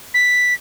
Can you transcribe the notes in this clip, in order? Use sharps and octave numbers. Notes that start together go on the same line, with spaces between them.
B6